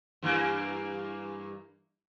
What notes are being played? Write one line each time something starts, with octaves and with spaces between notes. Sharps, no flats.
G2 E3 A#3